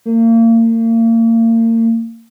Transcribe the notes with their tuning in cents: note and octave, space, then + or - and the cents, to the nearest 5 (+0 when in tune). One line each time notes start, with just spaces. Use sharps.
A#3 -35